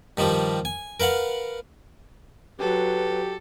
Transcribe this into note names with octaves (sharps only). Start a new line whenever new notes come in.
G2 D#3 F3 G3
G#5
A#4 B4 F5 F#5
F#3 G4 A4 B4